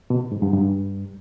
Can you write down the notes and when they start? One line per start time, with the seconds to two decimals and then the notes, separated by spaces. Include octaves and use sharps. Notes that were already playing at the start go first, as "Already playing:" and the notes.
0.10 B2
0.32 G#2
0.42 G2
0.53 G2